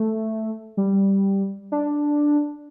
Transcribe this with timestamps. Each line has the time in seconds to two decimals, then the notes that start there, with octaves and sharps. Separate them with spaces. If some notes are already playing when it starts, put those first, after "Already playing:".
Already playing: A3
0.77 G3
1.72 D4